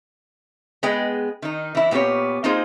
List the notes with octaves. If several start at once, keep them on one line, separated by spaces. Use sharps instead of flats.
G#3 B3 G#4 B4 D#5 G5
D#3 D#4
E3 E4
A#2 B3 C4 G4 C#5
A#3 C4 D#4 F4 G#4 C5